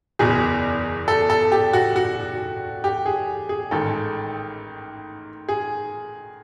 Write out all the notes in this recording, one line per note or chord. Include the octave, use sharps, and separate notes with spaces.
F#1 E2 B2 G#4
A4
A4
G4
F#4
F#4
G4
G#4
G#4
A1 G#2 D#3 A4
G#4